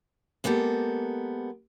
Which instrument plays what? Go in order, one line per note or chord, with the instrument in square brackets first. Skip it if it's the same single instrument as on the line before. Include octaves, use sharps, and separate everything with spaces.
[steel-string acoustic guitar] G#3 A#3 B3 G4 A4